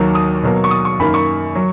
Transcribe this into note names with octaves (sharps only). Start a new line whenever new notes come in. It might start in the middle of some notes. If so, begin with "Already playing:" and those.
Already playing: D#2 D#3 F#3 A#3
D#6
B2 F#3 A#3
C#6
D#6
C#6
F#2 D#3 A#3 B5
C#6
F#3